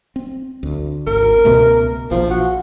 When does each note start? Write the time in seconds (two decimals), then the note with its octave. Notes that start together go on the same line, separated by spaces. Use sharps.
0.16 C4
0.63 D2
1.07 G#1 A#4
1.45 C#2 B2 A3
2.11 A#1 F3
2.30 F#4